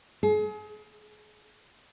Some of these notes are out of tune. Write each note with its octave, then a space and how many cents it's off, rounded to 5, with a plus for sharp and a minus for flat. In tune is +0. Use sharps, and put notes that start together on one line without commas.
G#4 +35